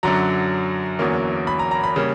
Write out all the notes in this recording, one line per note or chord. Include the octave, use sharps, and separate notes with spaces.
F#2 D3 F#3 A#5
E2 D3 F#3 A#3 C#4
B5
A#5
A#5
B5
C#3 G3 A#3 C#4